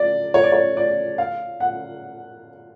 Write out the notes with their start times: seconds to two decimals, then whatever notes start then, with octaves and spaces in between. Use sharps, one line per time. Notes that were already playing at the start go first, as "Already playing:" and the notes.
Already playing: D5
0.34 C#5
0.44 D5
0.52 C#5
0.77 D5
1.18 F5
1.60 F#5